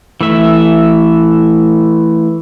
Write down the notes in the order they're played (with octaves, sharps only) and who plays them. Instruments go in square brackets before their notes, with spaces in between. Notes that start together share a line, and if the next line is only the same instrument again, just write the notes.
[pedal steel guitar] E3 A3 E5